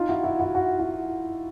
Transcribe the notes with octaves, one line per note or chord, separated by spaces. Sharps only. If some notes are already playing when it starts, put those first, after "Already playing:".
Already playing: D#4 F4
E4 F#4
E4 F#4
E4 F#4
F#4
E4 F#4